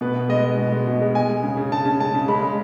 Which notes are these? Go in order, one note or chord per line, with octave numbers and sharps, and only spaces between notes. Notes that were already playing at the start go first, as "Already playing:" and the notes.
B2 B4
B2
G#3 D#5
G#3
B2
G#3
B2
G#3
G#3 G#5
G#3
C#3
C#3
C#3 A5
C#3
G#3 A5
C#3
G#3 B5
G#3